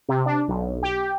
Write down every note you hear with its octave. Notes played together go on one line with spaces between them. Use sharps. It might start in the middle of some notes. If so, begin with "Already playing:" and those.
C3
D4
B1
G4